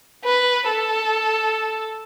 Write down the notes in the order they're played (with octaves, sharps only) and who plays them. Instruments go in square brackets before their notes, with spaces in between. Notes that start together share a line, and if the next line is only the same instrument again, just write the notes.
[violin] B4
A4